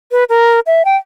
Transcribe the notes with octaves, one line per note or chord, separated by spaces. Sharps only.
B4
A#4
E5
G5